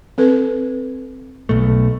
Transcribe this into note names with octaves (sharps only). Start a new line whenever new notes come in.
C4 A4 B4
B1 B2 A3